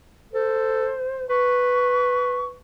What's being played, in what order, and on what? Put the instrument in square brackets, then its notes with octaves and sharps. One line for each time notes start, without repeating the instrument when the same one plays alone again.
[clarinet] A4 [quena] C5
[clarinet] B4 [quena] C#6